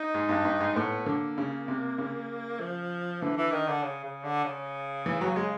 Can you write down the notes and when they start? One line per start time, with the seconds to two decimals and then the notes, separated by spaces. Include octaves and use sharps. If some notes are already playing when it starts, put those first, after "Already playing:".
Already playing: D#4
0.14 G#2
0.29 G2
0.45 G2
0.60 G#2
0.75 A2 B3
1.06 D3 A#3
1.38 C#3
1.68 C3
1.98 C#3
2.60 F3
3.21 D3 E3
3.37 E3
3.52 D#3
3.68 D3
3.83 C#3
4.04 C#3
4.24 D3
4.44 C#3
5.06 E3
5.21 F#3
5.36 G#3